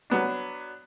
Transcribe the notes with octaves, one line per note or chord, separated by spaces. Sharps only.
F#3 B3 D4